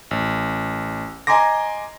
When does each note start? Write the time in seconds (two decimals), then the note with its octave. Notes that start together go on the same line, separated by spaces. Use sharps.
0.11 A1
1.27 D#5 G#5 A#5 C6 D6 A#6